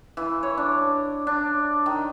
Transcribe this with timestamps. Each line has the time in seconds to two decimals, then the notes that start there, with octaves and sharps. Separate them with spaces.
0.17 E3
0.43 C#5
0.57 D4
1.27 D4
1.86 D#3